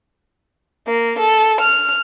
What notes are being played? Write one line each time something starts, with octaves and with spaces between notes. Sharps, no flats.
A#3
A4
F6